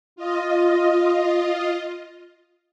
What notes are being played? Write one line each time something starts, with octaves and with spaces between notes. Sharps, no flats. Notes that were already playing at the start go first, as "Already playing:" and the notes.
F4 D#5